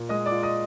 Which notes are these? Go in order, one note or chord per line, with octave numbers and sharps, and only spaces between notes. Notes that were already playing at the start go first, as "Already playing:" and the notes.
Already playing: A#2
G#3 D#5 D#6
D5 D6
F4
D#5 D#6